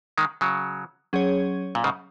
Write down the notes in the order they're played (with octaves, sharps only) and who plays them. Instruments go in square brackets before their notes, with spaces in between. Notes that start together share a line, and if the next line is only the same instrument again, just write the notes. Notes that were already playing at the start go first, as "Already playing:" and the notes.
[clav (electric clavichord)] D#3 G#3
C#3 F#3
[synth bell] F#3 C#4 G#4 C#5
[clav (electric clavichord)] A#2
G#2 C#3